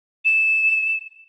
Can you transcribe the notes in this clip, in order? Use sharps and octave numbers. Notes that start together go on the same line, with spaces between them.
E7